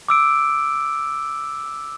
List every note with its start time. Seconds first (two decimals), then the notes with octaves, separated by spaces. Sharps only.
0.09 D6 E6 D7